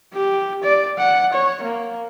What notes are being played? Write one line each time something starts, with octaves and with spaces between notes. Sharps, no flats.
G4
D5
F#5
C#5
A#3